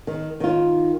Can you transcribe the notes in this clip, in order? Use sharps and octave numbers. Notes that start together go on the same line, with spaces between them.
D#3
D#3 F4